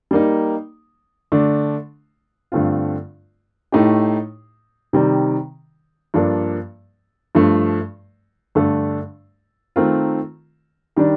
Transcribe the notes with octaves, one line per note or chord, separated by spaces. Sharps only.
G3 A#3 D#4
D3 A3 D4
G2 D3 A3 C4 F4
A2 A3 D#4 G4
C3 D#3 G3
G2 F3 A#3 D4 A4
G2 F3 A3
G2 D3 A3 D4 A4
D#3 A3 C4 F4 A#4
D#3 G3 D4